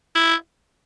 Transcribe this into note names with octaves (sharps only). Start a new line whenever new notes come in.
E4